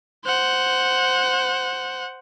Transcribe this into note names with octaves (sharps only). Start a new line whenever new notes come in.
C5 F#5